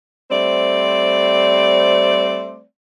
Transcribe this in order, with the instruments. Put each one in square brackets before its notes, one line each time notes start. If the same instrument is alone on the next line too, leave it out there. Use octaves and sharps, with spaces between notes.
[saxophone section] G3 A3 C4 C5 D5